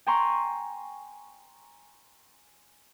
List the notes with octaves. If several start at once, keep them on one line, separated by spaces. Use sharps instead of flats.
G5 G#5 A#5 C6 C#6